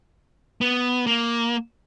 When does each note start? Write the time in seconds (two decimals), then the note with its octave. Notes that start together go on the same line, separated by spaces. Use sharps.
0.61 B3
1.07 A#3